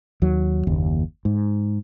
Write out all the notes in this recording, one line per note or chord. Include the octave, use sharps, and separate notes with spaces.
D#2 F#3
F#1 D#2
G#2